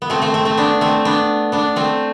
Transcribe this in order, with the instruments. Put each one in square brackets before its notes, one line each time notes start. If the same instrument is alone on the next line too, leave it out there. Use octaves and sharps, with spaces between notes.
[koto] B3
A3 C4
A3 C4
A3 C4
A3 C4
B3 D4
A3 C4
B3 D4
B3 D4
A3 C4